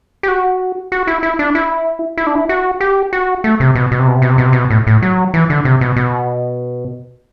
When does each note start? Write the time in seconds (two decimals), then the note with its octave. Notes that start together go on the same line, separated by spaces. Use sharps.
0.23 G4
0.28 F#4
0.92 F#4
1.07 E4
1.23 E4
1.39 D4
1.55 E4
2.17 E4
2.27 D4
2.35 E4
2.49 F#4
2.80 G4
3.13 F#4
3.44 A3
3.60 C3
3.75 B2
3.91 B2
3.99 C3
4.07 B2
4.14 C3
4.22 B2
4.29 C3
4.38 B2
4.45 C3
4.53 B2
4.70 A2
4.87 A2
5.02 F#3
5.34 E3
5.50 D3
5.65 C3
5.81 B2
5.96 B2